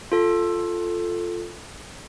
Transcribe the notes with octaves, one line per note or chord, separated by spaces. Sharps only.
F4 A4